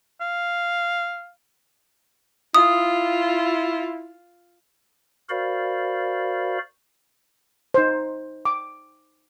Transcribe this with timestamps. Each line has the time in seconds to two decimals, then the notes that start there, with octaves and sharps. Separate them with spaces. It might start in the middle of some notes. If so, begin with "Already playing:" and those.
0.21 F5
2.54 E4 F4 D#6
5.29 F#4 A#4 C5 D5 F5 B5
7.74 D#4 C5
8.45 D6